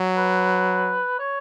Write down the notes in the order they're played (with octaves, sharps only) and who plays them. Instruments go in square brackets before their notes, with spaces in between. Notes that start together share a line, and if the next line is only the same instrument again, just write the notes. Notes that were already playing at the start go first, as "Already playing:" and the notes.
Already playing: [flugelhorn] F#3
[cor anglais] B4
C#5